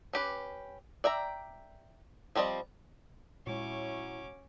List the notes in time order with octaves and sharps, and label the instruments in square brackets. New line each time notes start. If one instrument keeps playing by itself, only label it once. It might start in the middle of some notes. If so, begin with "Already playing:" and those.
[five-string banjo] C#4 G4 B4
D5 E5 G5 A#5
F3 G3 C4 D5 D#5
[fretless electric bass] A#2 G#3 [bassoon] F#3 [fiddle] C#4 D6 [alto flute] E4